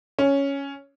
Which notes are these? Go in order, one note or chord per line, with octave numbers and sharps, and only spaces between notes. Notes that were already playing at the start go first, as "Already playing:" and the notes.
C#4